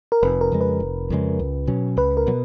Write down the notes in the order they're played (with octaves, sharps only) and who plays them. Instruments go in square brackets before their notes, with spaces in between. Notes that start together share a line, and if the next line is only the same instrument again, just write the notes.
[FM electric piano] A#4
[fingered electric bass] F1 [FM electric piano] B4
[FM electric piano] A#4
[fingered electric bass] F2 C#3 G#3
[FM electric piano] B4
[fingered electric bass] F1
F2 C#3 G#3
C#2
B2 F#3 C#4
[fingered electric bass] C#2 [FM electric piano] B4
[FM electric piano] A#4
[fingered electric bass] B2 F#3